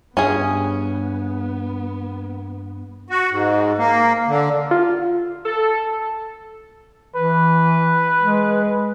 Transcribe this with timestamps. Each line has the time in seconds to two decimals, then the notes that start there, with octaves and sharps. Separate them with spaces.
0.17 G2 B3 C#4 G#4
3.10 F#4
3.31 G#2
3.78 A#3
4.28 D3
4.71 F4
5.45 A4
7.15 E3 B4
8.20 G#3